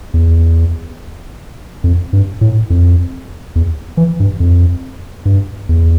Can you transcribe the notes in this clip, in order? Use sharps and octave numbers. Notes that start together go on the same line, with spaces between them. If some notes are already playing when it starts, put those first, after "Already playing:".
E2
F2
G2
A2
F2
E2
E3
G2
F2
G2
E2